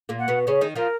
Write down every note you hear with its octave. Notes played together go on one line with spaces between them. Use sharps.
A#2 A#3
F#5
B2 B3
C#3 C#4 G#4
D#3 D#4
F3 F4 A#4